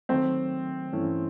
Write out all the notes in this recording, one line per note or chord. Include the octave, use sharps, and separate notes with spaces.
D#3 F#3 A3 C4
G2 E3 A3 C#4 E4